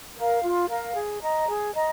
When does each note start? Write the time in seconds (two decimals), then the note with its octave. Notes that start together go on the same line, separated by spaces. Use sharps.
0.16 A#4 F5
0.42 F4
0.69 A#4 F5
0.95 G#4
1.21 D#5 A#5
1.48 G#4
1.74 D#5 A#5